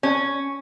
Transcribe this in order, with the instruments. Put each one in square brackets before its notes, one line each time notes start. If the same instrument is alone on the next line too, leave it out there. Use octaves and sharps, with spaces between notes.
[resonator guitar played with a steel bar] C#4